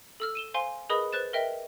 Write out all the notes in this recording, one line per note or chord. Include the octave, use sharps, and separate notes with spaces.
A4 E6 F6
D#7 E7 G7
C5 F5 G#5 C6
G#4 A#4 B4 D#5 B5 D#6
B4 C5 F#6 A6 E7
A#4 B4 D#5 E5 G5